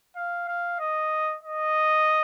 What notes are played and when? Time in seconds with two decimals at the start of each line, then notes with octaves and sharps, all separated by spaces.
0.16 F5
0.48 F5
0.79 D#5
1.43 D#5